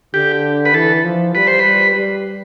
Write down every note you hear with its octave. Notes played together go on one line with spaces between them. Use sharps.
D3 G4
B4
E3 A4
F3
G3 B4
C5
B4
G3
G3